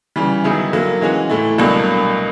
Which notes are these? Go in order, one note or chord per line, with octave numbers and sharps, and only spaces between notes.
C#3 E3 G3
D#3 F#3 B3 E4 G#4
D3 F#3 A#3
E3 G#3 C#4 F#4
A2 E3 A3
C2 B2 F#3 A#3 D4